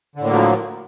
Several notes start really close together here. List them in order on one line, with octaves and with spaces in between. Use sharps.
D3 A2 A#3 F#3 F3